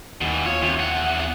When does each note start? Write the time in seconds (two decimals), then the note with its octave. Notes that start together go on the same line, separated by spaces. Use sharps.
0.21 D#2 B2 E3
0.46 F4 C#5
0.62 D#2 C3
0.79 E2 F#5